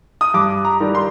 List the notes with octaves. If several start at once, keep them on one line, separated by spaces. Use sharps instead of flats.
D#6
G2 D6
A#5
D#3 G3
C6